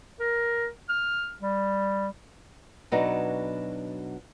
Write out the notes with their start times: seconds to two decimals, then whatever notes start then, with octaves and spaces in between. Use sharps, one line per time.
0.20 A#4
0.89 F6
1.41 G3
2.92 B2 F#3 B3 D4 D#4